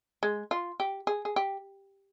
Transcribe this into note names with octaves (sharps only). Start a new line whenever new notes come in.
G#3
F4
G4
G#4
G#4
G4